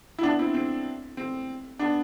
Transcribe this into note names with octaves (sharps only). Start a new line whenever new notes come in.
E4
B3 D4
C4 E4
C4
C4
B3 D4